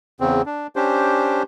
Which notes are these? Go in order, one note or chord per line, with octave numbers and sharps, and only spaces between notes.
E2 C#3 C4
D4
C#4 D4 G4 C5